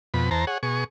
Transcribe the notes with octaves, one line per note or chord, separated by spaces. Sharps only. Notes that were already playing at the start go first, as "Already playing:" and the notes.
F2 B2 B5
E2 C5 A5 A#5
G#4 C#5 F#5
B2 G#4 C#6